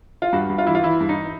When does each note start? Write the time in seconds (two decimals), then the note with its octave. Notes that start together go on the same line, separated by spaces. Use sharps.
0.22 F4
0.33 G2 F#4
0.50 G2
0.58 F4
0.67 E3 E4
0.75 F4
0.84 E3 E4
1.01 G2
1.09 D#4